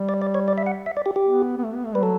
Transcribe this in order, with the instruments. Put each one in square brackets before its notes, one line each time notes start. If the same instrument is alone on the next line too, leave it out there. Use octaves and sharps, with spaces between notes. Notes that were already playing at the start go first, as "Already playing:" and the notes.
Already playing: [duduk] G3
[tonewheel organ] D5
D5
C#5
D5
E5
F#5
E5
D5
G4
G4
[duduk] B3
B3
A3
B3
A3
[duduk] G3 [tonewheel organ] B4
[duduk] F#3 [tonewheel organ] A4